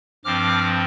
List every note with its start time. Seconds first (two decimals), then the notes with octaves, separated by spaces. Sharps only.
0.25 G2 F3 C4 D6 F6